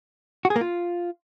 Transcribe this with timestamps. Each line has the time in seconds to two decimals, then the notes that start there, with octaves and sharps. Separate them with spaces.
0.45 F#4
0.50 G#4
0.56 A#3
0.61 F4